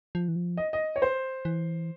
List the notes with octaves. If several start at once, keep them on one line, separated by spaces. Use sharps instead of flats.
F3
E3
F3
D#5
D#5
C#5
C5
E3